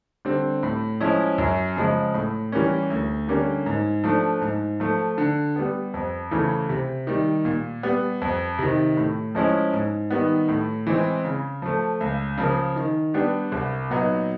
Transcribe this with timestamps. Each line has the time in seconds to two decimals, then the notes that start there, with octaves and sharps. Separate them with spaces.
0.25 D3 G3 C4
0.63 A2
1.00 F3 G#3 C#4 E4
1.38 F#2
1.76 C#3 F3 G#3
2.14 A2
2.52 E3 G3 A#3 C#4
2.90 D2
3.28 D3 G3 A#3 C#4
3.66 G#2
4.04 F3 A3 D4
4.41 G#2
4.80 F3 A3
5.18 D3
5.56 G3 B3
5.94 F2
6.31 C#3 E3 A3
6.69 C3
7.07 D#3 G3
7.45 A#2
7.83 G3 B3
8.22 F2
8.59 C3 D#3
8.97 A2
9.35 F3 G#3 C#4 E4
9.73 G#2
10.10 D#3 G3 B3
10.48 A2
10.87 E3 G#3 C4
11.24 C#3
11.62 F3 A3
12.00 C#2
12.38 C#3 F3 A#3
12.76 D#3
13.14 G3 B3 D4 G4
13.52 C2
13.90 A#2 F#3 B3 D#4